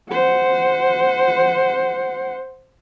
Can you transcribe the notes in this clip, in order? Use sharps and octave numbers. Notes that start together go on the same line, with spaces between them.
C5 F#5